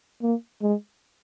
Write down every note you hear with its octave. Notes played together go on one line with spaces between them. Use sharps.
A#3
G#3